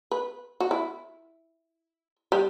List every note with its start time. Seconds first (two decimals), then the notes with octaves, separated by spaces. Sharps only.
0.11 B4
0.60 F#4
0.71 E4
2.32 G3